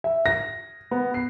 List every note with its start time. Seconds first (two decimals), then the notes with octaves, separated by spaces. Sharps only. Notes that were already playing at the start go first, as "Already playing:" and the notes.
0.04 E5
0.26 A#6
0.91 B3
1.14 C7